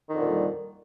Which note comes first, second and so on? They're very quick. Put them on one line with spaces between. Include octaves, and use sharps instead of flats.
D#3 F2 D3 A#2 G3